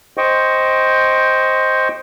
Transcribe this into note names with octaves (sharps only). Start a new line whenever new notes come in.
C5 D#5 G5 C#6